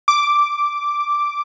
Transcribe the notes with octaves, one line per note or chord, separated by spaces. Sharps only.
D6